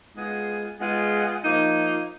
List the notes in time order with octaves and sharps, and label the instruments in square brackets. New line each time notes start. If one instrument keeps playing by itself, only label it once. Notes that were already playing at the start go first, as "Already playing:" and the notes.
[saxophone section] G#3 B3 F4 G#4
G#3 B3 F4 G#4
F3 A#3 D#4